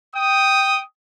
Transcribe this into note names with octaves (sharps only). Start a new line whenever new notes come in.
G5 D#6